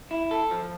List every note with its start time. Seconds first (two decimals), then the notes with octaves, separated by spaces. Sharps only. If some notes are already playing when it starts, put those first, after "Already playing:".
0.11 E4
0.31 A4
0.51 F3